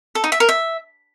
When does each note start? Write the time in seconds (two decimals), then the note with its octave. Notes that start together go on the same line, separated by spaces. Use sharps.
0.15 A4
0.24 D#4
0.32 E5
0.40 A#4
0.49 E5